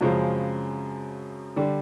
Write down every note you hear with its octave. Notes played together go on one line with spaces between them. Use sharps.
F#2 C#3 F3 G#3 C4
D3 G3